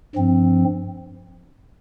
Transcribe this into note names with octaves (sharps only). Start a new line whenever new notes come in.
G2 F3 C4